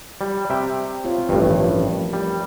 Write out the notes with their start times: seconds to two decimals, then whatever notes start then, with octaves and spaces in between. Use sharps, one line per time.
0.21 G3
0.50 C3 E5 G5
1.04 C4 F4 C#5
1.29 A1 G2 F3 A3 C#4
1.46 D#3 F3
2.13 G3